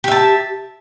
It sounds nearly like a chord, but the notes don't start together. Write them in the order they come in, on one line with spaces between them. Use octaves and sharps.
G4 E5 A5